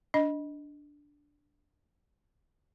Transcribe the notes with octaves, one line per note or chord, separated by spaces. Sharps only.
D4 D#5